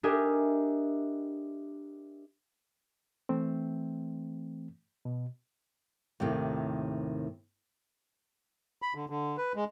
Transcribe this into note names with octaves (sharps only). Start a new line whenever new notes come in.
D4 G4 A#4 D#5 E5 G#5
E3 A3 C4
B2
D#2 A2 C3 D#3
B5
D3
D3
B4
G#3